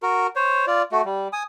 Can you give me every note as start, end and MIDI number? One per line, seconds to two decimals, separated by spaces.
0.03 0.27 66
0.03 0.27 70
0.36 0.65 72
0.36 0.65 73
0.67 0.82 65
0.67 0.82 74
0.92 1.01 57
0.92 1.01 66
1.05 1.28 55
1.33 1.43 80
1.33 1.43 87